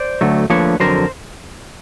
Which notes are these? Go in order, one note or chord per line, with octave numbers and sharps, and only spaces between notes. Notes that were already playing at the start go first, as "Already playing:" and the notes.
Already playing: C5 D5
D2 D3 F#3 A3
D2 D3 F3 A#3 B4 C#5
F2 D3 F#3 A#4 C5